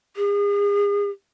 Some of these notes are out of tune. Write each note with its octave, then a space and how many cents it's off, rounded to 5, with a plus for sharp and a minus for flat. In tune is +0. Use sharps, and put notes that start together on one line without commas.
G#4 -40